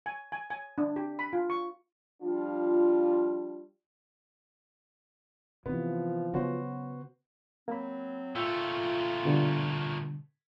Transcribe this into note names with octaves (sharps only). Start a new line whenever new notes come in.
G#5
G#5
G#5
D4
G4
B5
F4
C#6
F3 G3 D4 F4
C3 E3 F3 B3
C#3 F#3 B3 F#4 C5
F#3 A#3 C4 B5
A#2 A3 F4 G5 E6 G6
B2 D3 G3